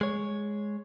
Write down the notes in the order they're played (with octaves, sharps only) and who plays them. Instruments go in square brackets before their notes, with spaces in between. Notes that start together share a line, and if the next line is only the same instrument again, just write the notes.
[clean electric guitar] G#3 C#5